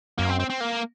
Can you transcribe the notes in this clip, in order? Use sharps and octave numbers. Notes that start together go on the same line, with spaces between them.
F#2 A#3
C4
C4
C4
A#3